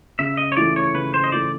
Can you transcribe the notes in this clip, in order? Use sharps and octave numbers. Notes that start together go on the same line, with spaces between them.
C#3 E5
D#5
C#5
E3 A3 D5
C#5
C#3 B4
C5
D#5
E3 A3 D5